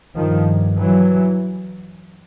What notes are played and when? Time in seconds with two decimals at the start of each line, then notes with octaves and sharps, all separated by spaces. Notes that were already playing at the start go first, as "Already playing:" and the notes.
0.16 G2 D#3 F3
0.79 E3 F#3